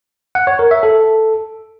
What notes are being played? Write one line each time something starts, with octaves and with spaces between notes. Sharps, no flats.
F#5
C#5
A#4
E5
A4